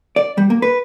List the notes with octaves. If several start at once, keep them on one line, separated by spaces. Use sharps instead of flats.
D5
G3
A#3
B4